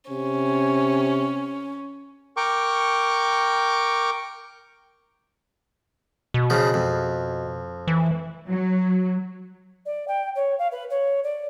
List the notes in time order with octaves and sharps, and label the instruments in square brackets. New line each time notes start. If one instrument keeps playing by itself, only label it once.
[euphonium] C3 [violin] C#4
[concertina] A#4 G5 C#6 D6
[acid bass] B2
[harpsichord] C#3 F3
F2
[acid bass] E3
[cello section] F#3
[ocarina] D5
G5
C#5
F5
B4
C#5
D5